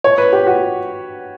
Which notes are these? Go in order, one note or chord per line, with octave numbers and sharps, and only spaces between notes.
C#5
B4
G4
F#4